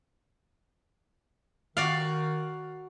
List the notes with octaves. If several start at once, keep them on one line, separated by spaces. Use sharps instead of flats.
D#3 F#4 D5 F5